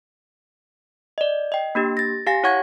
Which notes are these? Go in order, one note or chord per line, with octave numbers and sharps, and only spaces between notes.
D5 D#5
D#5 G5
A#3 D4 G4
A6 A#6
G4 F5 G#5 A#6
E4 C#5 F#5 C#6 G#6